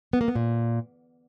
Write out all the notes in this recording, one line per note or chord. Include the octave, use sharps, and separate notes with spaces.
B3
A#3
B3
A#2